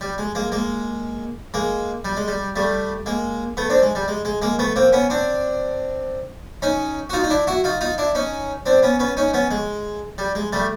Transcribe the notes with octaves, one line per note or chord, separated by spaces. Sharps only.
G3
G#3
G#3 A#3
G#3 A#3
G#3 A#3
G3
G#3
G3
G3 A3
G#3 A#3
A3 B3
C4 D4
G#3
G3
G#3
G#3
G#3 A#3
A3 B3
A#3 C4
B3 C#4
C4 D4
C#4 D#4
F#4
D#4 F4
D#4
D4 E4
E4 F#4
D#4 F4
D#4 F4
D4 E4
C#4 D#4
C4 D4
B3 C#4
B3 C#4
C#4 D#4
B3 C#4
G#3
G3
G#3
G3 A3